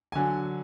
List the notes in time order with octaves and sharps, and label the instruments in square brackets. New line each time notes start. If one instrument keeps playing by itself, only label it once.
[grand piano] D3 F#3 G#5